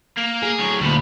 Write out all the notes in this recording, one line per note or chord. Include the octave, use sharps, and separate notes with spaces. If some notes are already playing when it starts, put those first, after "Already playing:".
A#3
G#4
A2 F#3
D2 A#2 G3 B5